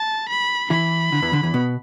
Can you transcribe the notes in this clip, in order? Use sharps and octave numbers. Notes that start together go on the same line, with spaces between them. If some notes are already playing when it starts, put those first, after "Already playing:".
Already playing: A5
B5
E3 E4 B5
D3
E2 E3
D3
E2 E3
B2 B3